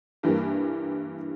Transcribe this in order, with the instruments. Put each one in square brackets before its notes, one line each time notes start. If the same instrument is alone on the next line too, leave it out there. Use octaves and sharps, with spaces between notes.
[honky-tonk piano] G2 E3 G3 A#3